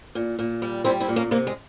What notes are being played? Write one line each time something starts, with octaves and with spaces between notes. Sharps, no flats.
A#2
A#2
G3
G3 C4 E4
C4 E4
A#2
A#3 C#4
C3 A#3
G#3